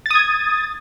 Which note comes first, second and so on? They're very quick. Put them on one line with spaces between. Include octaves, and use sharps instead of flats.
A6 D#6 G#6